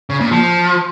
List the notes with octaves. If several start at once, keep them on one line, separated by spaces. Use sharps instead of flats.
C#3
A#2
F3